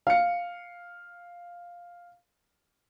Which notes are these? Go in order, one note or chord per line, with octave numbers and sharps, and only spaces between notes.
F5 C#7